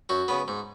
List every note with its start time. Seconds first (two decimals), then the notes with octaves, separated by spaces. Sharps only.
0.09 F#2 F#4
0.28 C#3 B3
0.48 G#2